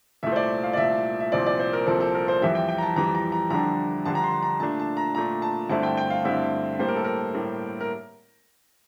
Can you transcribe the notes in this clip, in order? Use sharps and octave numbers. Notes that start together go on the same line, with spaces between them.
C2 A#2 A3 E5
C5
D5
F5
D5
C2 A#2 A3 E5
E5
C2 A#2 F3 C4 D5
D5
C5
A#4
C2 A#2 F3 C4 A4
A4
A#4
C5
F2 E3 G3 E5
G5
G5
A#5
A5
F2 E3 G3 A#5
A#5
A#5
F2 D3 G3 D4 A#5
F2 D3 G3 D4 A5
A#5
C6
A#5
A#2 A3 D4 A5
A5
A#5
A#2 A3 D4 A#5
A5
G2 D3 A3 C4 E4 A5
G5
G5
F5
G2 D3 A3 C4 E4 E5
A2 G3 A#3 C5
A#4
A4
A#4
A2 G3 A#3
A#4